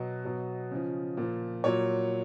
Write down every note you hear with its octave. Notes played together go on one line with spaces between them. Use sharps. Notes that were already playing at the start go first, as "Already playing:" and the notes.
Already playing: B2 F#3 D#5
B2 F#3
C#3 F3
A#2 F3
A#2 F#3 C#5